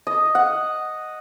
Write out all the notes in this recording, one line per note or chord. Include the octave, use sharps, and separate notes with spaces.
D#5
F#5